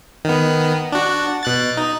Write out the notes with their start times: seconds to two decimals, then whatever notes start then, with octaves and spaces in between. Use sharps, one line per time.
0.25 D#3 B3
0.92 D4 F#4
1.43 B2 F#6 A6
1.77 D#4